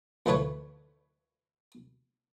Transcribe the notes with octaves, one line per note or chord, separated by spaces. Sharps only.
D2 E3 F3 A3 B4 C#5